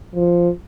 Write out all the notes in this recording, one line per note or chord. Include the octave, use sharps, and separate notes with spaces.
F3